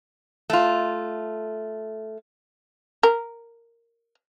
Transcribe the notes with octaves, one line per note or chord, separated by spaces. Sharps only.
A3 F4
A#4